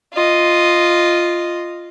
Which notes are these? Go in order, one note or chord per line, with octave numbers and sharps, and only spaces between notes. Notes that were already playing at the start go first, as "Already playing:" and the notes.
F4 D#5